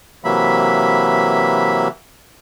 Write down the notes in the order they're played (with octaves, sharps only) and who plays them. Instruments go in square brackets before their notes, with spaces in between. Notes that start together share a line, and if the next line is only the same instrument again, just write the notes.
[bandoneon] C3 E3 F#3 A#3 E5 B5